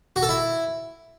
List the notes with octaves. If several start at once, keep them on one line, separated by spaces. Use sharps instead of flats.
F#4
A4
E4